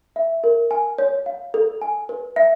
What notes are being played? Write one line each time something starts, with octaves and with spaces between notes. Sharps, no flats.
E5
A#4
G#5
C#5
F5
A4
G#5
B4
E5